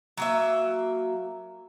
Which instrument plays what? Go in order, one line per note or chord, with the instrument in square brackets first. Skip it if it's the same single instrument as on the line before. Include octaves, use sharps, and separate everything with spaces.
[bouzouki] F#3 A#3 E5